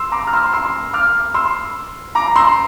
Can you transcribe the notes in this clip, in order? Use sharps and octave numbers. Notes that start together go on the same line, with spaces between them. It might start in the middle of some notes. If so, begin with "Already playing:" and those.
Already playing: C6 E6
A#5 D6
F6
C6 E6
C6 E6
D6 F6
C6 E6
A#5 D6
C6 E6